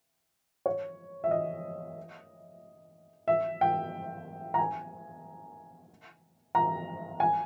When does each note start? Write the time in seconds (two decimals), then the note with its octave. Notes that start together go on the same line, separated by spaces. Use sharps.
0.66 C#5
1.24 E5
1.31 D#5
3.28 E5
3.61 G5
4.54 A#5
4.59 G#5
6.55 A#5
7.20 G#5